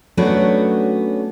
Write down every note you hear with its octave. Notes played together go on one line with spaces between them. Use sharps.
F#3 A3 B3 C#4 D4 F#4